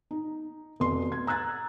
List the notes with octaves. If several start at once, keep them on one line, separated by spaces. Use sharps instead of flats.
D#4
F1 B2 C6
G#6
A#5 E6 F#6 G#6 A6